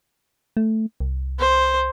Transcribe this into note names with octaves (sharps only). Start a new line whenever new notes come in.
A3
C2
C5